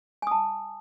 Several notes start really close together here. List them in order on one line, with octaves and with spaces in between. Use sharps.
G#5 D#6 A5